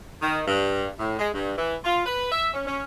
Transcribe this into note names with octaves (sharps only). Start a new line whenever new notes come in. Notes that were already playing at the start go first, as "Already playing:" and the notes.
D#3
G2
A2
G#3
G2
E3
F4
B4
E5
C#4
C#4